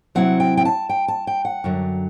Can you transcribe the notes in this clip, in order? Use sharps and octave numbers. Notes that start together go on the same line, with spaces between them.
C3 F#3 C4 E4 F#5
G5
G5
A5
G5
A5
G5
F#5
F#2 D3 F#3